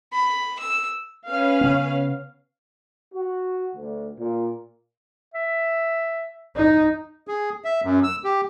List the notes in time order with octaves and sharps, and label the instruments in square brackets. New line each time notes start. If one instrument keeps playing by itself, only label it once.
[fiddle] B5
E6
[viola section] C#4 B4 F5
[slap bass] C#3 B3
[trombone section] F#4
D2
A#2
[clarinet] E5
[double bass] D#4
[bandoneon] G#4
E5
F#2
E6
G4